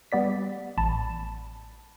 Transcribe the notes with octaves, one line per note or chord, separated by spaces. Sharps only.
G3 B3 D5 B6
A1 A5 B5